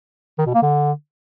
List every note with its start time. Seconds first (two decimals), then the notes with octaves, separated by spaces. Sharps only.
0.38 D#3
0.46 B2
0.54 A#3
0.62 D3